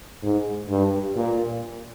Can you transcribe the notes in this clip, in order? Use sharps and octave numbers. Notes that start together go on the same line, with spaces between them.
G#2
G2
A#2